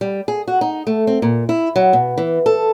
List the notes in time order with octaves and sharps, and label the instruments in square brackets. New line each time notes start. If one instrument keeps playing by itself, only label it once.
[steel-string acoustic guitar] G3
G#4
F#4
D#4
A3
C4
A#2
E4
F#3
B2
E3
A4